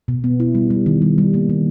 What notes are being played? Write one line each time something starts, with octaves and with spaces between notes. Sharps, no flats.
B2
B3
E4
G3
G3
D#3
G3
G3
A#3
D#3